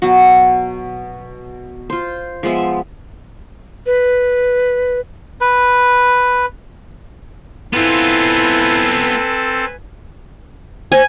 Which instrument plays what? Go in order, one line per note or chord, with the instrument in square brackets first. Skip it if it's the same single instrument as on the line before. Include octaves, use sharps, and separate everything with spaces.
[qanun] B2 F#3 B3 F#4
F4 C5
F3 G#3 B3 E5
[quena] B4
[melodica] B4
[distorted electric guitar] B3 F4 [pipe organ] C4 A4 [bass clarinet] E4 [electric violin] B4 G#5
[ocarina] C5 [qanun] G#5